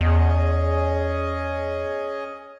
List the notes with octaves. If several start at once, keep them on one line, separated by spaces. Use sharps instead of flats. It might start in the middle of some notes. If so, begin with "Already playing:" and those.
E2 C#4 G#4 D#5